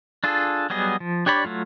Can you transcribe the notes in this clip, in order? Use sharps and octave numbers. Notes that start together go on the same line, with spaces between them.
D4 F4 G#4 A4
F#3 G3 B3 G#4 D#5
F3
D4 G4 C#5 D5 B5
F#3 A3 F4